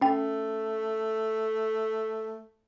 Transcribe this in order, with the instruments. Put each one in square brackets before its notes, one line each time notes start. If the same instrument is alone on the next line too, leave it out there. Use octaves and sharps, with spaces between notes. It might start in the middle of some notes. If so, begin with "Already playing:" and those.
[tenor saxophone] A3 [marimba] C#4 G5